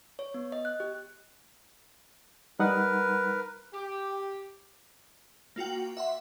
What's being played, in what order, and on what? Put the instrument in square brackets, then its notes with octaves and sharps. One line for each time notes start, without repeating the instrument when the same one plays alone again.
[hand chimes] C#5
B3
D#5
F#6
G4
[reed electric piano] G3 D#4 F#5 [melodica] A#4 B4
[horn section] G4
[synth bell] A#3 F4 F#4 G5
E5 F#5 C6